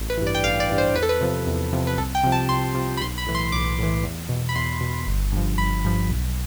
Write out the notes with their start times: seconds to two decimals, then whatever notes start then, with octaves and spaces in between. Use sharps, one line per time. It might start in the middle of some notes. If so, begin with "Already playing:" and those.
Already playing: A1
0.10 B4
0.17 G2 E3
0.27 D5
0.35 G5
0.44 A1 F5
0.60 D5
0.69 G2 E3
0.78 C5
0.95 E2 B4
1.03 A4
1.09 B4
1.21 C3 F3
1.47 E2
1.73 C3 F3
1.87 B4
1.98 C2 A4
2.15 G5
2.24 C3 F3
2.32 A5
2.49 C2 C6
2.75 C3 F3
2.97 B5
3.01 B1 C6
3.18 B5
3.27 A2 E3
3.35 C6
3.52 B1 D6
3.79 A2 E3
4.04 E2
4.29 B2
4.49 B5
4.55 E2 C6
4.81 B2
5.06 G1
5.32 G2 F3
5.58 G1 B5
5.84 G2 F3
6.10 B1